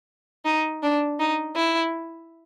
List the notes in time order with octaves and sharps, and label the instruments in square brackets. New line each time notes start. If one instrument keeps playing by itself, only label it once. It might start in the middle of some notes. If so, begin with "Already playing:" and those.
[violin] D#4
D4
D#4
E4